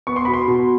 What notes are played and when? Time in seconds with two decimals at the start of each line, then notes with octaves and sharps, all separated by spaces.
0.07 B3 C#6
0.16 C6
0.25 B2 B5
0.34 C6
0.48 B2